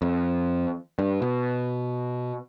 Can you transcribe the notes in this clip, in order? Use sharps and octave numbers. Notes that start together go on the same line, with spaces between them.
F2
G2
B2